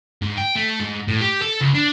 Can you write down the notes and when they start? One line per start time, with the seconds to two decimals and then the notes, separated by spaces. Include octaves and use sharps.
0.22 G#2
0.37 G5
0.55 A3
0.80 G#2
1.08 A2
1.21 G4
1.42 A4
1.61 C#2
1.75 D4